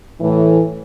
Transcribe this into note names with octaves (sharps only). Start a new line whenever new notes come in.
A2 E3